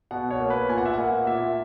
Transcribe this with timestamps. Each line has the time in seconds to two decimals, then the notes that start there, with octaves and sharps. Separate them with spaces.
0.11 B2 F#5
0.31 C#5
0.40 A#3
0.50 B4
0.69 A#2 G#5
0.78 F#5
0.85 E5
0.93 A#3 F#5
1.27 A#2 E5